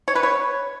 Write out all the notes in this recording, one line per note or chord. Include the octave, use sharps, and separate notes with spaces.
C#5
B4
C#5